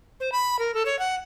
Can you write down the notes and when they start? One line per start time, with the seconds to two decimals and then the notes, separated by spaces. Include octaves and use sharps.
0.20 C5
0.32 B5
0.59 A#4
0.74 A4
0.86 C#5
0.99 F#5